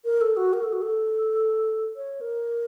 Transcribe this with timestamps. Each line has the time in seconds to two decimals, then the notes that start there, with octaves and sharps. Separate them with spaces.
0.05 A#4
0.21 A4
0.37 F#4
0.53 A#4
0.63 A4
0.73 F#4
0.82 A4
1.96 C#5
2.21 A#4